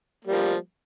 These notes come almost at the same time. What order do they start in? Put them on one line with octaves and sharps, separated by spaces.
A#3 G3 F3